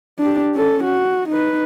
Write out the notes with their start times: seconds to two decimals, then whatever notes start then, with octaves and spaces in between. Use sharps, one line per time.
0.19 D4 G4
0.54 C#4 A4
0.84 F#4
1.29 D#4 B4